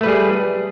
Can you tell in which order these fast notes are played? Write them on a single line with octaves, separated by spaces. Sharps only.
A3 B4 G3 G#4